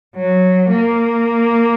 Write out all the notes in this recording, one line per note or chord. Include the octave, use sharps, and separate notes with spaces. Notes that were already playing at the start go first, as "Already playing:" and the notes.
F#3
A#3